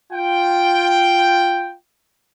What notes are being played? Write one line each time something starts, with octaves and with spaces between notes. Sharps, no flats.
F4 G5